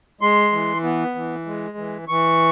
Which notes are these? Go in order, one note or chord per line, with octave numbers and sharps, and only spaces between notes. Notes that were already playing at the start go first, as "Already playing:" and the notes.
G#3 C6
E3
B3
E3
G#3
E3
E3 C#6